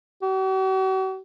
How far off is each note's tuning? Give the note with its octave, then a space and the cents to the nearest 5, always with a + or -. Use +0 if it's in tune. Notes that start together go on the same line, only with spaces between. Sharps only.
F#4 +45